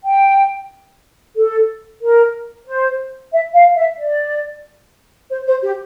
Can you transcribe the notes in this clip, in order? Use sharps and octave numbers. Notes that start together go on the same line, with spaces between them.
G5
A4
A#4
C5
E5
F5
E5
D5
C5
C5
G4